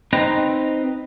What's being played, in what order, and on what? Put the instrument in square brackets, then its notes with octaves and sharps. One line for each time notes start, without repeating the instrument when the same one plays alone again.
[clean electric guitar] C4 D#4 B4 A#5